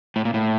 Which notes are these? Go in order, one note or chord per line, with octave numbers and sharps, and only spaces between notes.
A2
A#2
A2